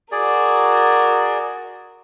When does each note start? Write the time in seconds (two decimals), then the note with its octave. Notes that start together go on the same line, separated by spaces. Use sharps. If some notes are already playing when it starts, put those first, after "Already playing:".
0.12 F#4 G#4 A#4 D5